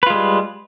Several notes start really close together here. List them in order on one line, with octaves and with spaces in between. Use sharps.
B4 F4 G#3 G3